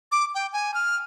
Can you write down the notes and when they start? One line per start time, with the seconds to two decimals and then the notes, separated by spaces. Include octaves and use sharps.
0.12 D6
0.34 G5
0.53 G#5
0.74 F6